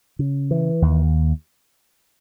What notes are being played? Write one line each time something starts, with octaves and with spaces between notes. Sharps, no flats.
C#3
E3
D#2